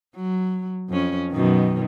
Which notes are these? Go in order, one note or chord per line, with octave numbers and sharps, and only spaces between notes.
F#3
F2 C#4
F#2 B2 D#3